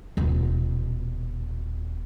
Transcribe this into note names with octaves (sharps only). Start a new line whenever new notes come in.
D#1 B2